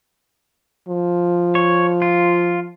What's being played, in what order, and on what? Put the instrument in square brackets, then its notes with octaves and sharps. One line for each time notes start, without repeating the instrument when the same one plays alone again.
[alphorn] F3
[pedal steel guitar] C#5
F4